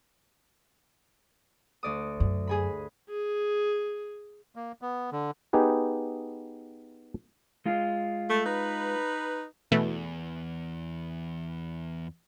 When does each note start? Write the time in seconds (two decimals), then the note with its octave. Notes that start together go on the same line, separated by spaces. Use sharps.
1.83 D2 D5 D#6
2.20 F#2
2.47 G#4 G#5 B5
3.09 G#4
4.56 A#3
4.82 B3
5.12 D3
5.53 B3 D#4 G4 G#4 B4
7.66 G#3 F4
8.29 A3
8.46 D#4 B4
9.72 E2 B2 E3 A3